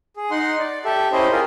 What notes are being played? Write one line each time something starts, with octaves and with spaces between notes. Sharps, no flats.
G#4
D#4 F#5 C6
D5
G4 A4 E5
C#4 E4 G4 C5 D#5
F4 G4 G#4 A#4